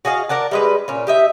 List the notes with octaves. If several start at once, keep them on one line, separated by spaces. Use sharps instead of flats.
F#4 G#4 D#5 F5
A#4 D5 F#5 A5
G3 G#3 B4
A#2 C#4
G4 D#5 E5